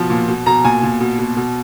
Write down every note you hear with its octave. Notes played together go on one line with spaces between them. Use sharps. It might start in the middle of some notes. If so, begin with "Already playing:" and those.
Already playing: B2 F3
A#2
B2
B2 A#5
A#2 G#5
A#2
B2
B2
B2